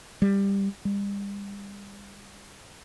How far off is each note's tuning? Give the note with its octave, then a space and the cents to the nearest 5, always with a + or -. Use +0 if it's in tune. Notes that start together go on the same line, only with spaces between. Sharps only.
G3 +15
G3 +40